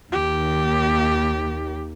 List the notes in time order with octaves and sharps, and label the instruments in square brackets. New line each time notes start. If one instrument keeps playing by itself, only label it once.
[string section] D#2 [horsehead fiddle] G4